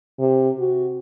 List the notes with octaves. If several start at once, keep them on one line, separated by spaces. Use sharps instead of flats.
C3
F#4